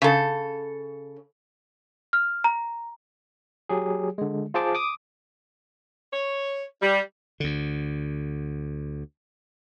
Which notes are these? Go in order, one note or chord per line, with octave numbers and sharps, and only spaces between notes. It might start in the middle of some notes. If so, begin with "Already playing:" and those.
C#3 A4
F6
A#5
F#3 G4 G#4
D3 G#3
F4 G#4 C5 A5 D6
D6 D#6
C#5
G3
D2 D3